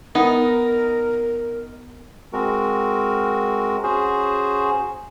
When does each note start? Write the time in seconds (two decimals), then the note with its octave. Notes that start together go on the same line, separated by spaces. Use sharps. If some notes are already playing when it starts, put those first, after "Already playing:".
0.15 B3 D#4 A#4
2.33 G#3 C4 F#4 A#4
3.83 C#4 F#4 G#4 C5